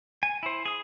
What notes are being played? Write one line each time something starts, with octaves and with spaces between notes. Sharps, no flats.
G#5
E4 C5
G#4 D#6